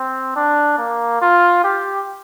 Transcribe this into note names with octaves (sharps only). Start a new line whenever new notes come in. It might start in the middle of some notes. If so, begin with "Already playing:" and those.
Already playing: C4
D4
A#3
F4
G4